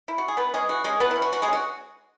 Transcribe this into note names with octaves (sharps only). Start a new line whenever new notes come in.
E4
F#4
G#4
E3 B3 B4
G#3 C#4 G#4
E3 F#4
G#3 C#4 G#4
E3 B3 B4
C#4 E4
F#4
E3 F#4
G#3 G#4
C#4 F#4